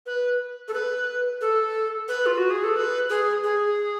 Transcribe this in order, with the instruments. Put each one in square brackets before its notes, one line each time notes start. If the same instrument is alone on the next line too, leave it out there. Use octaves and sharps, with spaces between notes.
[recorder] B4
A4
B4
A4
B4
F4
F#4
G#4
A4
B4
G#4
G#4